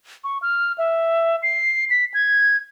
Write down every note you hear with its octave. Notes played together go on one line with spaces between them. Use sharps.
C#6
F6
E5
C7
B6
G#6